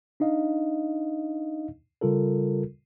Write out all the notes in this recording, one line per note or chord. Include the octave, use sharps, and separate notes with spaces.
D4 D#4 D#5 F5
C#3 G3 F4 A4 A#4